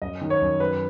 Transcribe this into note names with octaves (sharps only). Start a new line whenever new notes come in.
F#2 D#5
D#3
C#5
F#2
F#2 B4